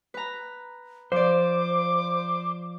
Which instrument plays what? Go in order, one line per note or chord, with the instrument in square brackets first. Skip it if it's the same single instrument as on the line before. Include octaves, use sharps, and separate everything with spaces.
[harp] B4 A#5
[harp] F3 D5 [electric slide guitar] C5 [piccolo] D6